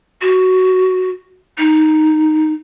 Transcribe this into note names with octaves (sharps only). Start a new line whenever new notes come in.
F#4
D#4